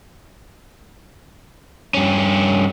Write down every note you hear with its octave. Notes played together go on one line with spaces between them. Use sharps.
G2 C#4